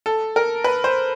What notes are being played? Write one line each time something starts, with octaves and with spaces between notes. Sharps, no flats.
A4
A#4
B4
C5